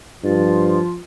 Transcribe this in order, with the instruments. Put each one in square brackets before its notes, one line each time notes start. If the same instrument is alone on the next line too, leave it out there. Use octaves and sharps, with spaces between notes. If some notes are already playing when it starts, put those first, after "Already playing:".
[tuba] G2 [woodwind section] F3 F4